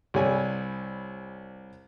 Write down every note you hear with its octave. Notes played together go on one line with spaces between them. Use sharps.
C2 G3 C#5 G#5